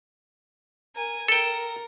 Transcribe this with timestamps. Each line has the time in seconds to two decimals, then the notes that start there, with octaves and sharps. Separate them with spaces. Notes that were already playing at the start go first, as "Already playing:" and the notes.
0.96 A#4 G#5
1.28 A4 A#4 G5